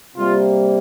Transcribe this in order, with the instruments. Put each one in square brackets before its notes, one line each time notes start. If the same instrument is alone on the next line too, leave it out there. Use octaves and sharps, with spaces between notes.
[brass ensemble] C3 G3 A#3 F4